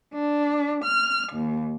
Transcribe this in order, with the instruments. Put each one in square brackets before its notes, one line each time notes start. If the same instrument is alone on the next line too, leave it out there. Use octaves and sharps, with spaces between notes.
[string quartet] D4
F6
D#2